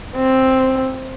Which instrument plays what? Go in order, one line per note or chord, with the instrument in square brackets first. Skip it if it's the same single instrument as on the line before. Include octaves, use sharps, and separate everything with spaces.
[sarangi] C4